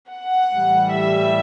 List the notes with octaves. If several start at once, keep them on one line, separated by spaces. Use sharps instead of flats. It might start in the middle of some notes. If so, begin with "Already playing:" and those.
F#5
A2 E3 G3
E5